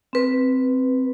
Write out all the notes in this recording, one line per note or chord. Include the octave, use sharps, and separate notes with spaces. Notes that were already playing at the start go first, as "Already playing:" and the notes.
C4 B4